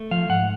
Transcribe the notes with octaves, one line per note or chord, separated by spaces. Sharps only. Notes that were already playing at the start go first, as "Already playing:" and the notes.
Already playing: A3
F3 F5
G#2 F#5